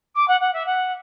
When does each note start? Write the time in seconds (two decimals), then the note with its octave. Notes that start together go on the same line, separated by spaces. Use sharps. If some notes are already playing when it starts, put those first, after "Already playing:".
0.15 D6
0.27 F#5
0.40 F#5
0.53 E5
0.65 F#5